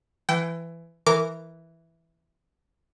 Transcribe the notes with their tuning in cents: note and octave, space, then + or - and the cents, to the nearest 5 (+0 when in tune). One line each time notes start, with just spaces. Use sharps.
E3 +20 G5 -25
E3 +0 A#4 -10 D6 -20